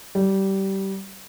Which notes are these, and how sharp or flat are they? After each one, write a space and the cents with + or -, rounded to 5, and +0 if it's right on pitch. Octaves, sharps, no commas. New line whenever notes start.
G3 -20